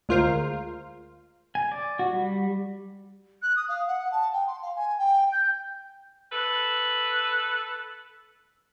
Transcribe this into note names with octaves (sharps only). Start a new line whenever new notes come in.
D2 G#3 F4 A#4 C5 F5
G#5
D5
F#4
G3
F#6
D#6
F5
F#5
A5
G5
C6
F5
G#5
G5
G6
A4 B4